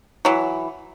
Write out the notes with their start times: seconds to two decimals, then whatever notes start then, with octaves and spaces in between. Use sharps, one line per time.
0.25 E3 F#3